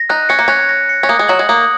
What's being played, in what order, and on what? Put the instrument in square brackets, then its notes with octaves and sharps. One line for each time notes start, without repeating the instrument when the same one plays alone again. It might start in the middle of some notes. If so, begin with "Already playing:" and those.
Already playing: [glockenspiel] A#6
[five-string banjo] D#4 [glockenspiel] F#6
[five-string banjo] C#4 [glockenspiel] C#7
[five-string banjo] A#3
[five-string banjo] C#4 [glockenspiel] F#6
[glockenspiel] A#6
C#7
[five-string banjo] C#4
[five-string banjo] A#3 [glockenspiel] D#6
[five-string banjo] G#3
[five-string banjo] F#3 [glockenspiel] F#7
[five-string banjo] G#3
[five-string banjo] A#3 [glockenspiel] D#6